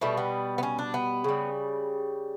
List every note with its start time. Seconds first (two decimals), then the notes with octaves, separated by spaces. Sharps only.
0.01 B2 G3 A3
0.17 B3
0.58 B3
0.63 C#4
0.79 D4
0.94 B3
1.24 C#3 G3